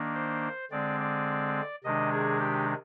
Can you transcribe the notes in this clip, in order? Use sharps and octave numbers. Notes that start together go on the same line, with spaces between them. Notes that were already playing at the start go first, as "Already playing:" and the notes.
Already playing: D#3 A#3 D4
C5
D3 G#3 C4 D5
D5
C3 D#3 G#3 D4 D#5
G#4
G4